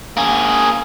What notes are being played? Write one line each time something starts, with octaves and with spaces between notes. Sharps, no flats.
A#3 G#4